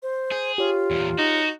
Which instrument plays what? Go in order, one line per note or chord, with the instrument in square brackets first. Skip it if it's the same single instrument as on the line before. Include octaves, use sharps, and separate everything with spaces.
[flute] C5
[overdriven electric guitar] G#4 [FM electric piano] G6
[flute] F4 [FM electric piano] G4 C#5
[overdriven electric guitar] E2 A#2
[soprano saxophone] D#4 [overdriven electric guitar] F#4